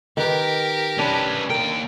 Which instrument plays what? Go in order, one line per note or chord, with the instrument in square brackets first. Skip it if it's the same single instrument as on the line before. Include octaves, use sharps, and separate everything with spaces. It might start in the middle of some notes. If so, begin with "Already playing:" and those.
[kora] D#3 B4 [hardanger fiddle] G4 A#4
[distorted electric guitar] C#4 B4 [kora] D4
[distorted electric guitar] D#2 G5 [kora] A#4